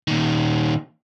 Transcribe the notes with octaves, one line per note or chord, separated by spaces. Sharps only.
A#2 D#3